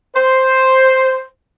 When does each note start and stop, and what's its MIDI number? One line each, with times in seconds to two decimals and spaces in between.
0.15 1.23 72